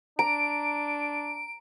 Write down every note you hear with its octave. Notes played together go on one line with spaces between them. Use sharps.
D4 A#5 D7